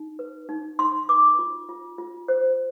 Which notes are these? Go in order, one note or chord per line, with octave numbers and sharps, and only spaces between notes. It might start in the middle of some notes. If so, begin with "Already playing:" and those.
Already playing: D#4
B4
D#4
D#4 C6
B4 D6
F4
F4
F4
C5